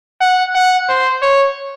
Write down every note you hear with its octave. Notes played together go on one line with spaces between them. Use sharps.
F#5
F#5
C5
C#5